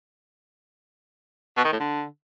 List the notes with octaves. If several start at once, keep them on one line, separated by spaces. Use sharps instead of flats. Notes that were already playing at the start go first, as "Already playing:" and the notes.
B2
D#3
A2
D3